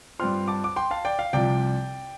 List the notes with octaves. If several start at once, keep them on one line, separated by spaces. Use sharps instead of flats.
G2 G3 C4 F4 C6 F6
A5 D6
D6
G5 C6
F5 A5
D5 G5
F5
C2 C3 F3 D5 G5